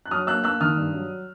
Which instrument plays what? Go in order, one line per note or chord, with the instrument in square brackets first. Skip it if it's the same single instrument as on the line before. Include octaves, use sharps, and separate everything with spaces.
[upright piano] F#6
F#3 D#6 F6
A#3 E6 F#6
A#3 E6 F#6
D#3 D#6 F6
G2
F#3